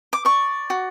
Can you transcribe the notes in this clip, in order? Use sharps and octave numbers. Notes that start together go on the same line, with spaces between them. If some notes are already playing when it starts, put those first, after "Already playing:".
D6
D5 C#6
F#4